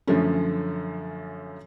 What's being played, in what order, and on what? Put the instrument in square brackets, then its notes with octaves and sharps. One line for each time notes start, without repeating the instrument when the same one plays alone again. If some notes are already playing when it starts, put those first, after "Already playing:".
[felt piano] F#2 D3 F3 A3 C#4